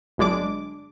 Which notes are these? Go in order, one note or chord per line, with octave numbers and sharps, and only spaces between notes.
G1 F#2 G#3 D4 D6